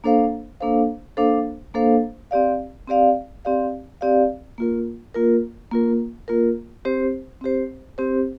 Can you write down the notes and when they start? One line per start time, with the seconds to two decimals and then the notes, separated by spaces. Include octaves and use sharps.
0.04 A#3 D4 A4 C5 F5
0.60 A#3 D4 A4 C5 F5
1.17 A#3 D4 A4 C5 F5
1.74 A#3 D4 A4 C5 F5
2.31 C4 G4 D5 F5
2.88 C4 G4 D5 F5
3.45 C4 G4 D5 F5
4.01 C4 G4 D5 F5
4.58 A#3 F4 A#4
5.14 A#3 F4 A#4
5.71 A#3 F4 A#4
6.28 A#3 F4 A#4
6.85 C4 G4 C5
7.41 C4 G4 C5
7.98 C4 G4 C5